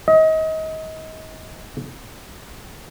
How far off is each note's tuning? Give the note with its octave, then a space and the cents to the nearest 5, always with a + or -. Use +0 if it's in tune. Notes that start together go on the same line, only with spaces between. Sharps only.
D#5 +30